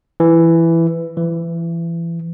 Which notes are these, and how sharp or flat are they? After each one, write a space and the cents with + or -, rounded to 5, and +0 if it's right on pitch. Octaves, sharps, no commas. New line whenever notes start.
E3 +10
E3 +30